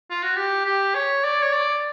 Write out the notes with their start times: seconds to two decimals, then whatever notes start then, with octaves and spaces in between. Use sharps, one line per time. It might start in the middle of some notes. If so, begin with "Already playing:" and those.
0.10 F4
0.23 F#4
0.36 G4
0.66 G4
0.95 C#5
1.24 D5
1.43 C#5
1.53 D5